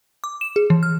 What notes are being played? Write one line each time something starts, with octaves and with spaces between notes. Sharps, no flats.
D6
E7
G#4
E3
F6